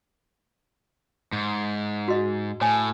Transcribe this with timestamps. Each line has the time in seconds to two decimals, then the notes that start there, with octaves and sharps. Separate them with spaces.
1.33 G#2
2.08 F#4 D#5
2.61 A2 C#5 G#5